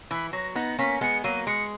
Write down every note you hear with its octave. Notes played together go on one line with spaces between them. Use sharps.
E3 B5
F#3 A#6
B3 D#4 A#6
A#3 C#4 B6
G#3 B3 C#7
F#3 A#3 D#7
G#3 C#7